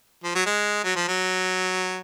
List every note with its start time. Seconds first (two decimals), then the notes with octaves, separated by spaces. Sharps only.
0.24 F3
0.35 F#3
0.46 G#3
0.84 F#3
0.96 F3
1.08 F#3